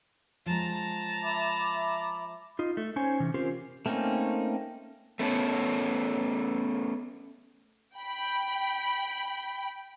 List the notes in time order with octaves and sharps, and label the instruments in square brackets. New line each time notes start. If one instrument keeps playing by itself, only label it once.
[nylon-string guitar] F3 G#3 [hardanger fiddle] A5 A#5
[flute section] E5 B5 D6
[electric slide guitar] D#4 F4
A3
C#4 D#4 C5 C#5 G#5
C3 E3 C#4
C4 C#4 F4 G4 A#4 C5
[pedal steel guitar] A3 A#3 C4 C#4 D#4
[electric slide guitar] A3 B3 C#4 A4
[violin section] G5 B5